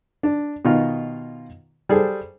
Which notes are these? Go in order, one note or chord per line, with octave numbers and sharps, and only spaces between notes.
D4
B2 D#3 D#4 F4 F6
G3 G#4 A4 C5